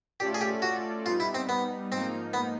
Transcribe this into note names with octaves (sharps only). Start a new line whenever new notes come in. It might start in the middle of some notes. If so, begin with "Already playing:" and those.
A3 C#4 F4 G4 A4 D5
G#4
G4
F#4
G3 B3 D#4 F4
E4
C4
B3
G#2 F3 A#3 C4 D#4
B3